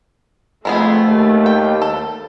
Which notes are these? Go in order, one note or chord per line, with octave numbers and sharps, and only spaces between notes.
F2 G#3 A3 B3 G#4
D#2
G5
A4